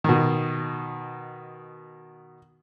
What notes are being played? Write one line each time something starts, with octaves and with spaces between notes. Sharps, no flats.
B2 D#3